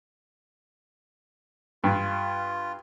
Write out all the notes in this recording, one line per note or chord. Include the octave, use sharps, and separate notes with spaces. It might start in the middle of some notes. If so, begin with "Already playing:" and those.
G2 F4